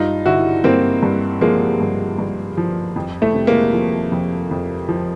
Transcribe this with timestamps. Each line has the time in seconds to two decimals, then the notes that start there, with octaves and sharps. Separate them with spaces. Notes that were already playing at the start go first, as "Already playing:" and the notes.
Already playing: G2 D#4 F4
0.26 D3 E4 F#4
0.64 G2 A#3 C4
1.03 G2
1.41 F3 G#3 A#3
1.80 G2
2.19 G2
2.57 F3
2.96 F2
3.22 A3
3.34 C3
3.47 G#3 A#3
3.73 F3
4.12 F2
4.51 F2
4.89 F3